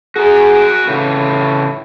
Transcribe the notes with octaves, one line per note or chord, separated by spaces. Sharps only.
F#4 G#4 A#4
A2 C#3 E3